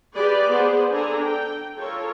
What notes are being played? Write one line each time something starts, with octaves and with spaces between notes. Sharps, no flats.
G4 G#4 B4 D5
B3 G#4 C5
D4 A4 G#5 A#5
G5
F4 A4 A#4 C#5